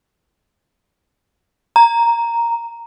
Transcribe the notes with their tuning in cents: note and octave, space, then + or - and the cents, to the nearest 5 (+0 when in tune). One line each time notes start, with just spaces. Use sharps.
A#5 -5